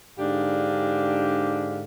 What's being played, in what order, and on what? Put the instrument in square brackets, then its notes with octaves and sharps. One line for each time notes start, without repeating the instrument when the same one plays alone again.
[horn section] G#2 D3 D4 G4 F5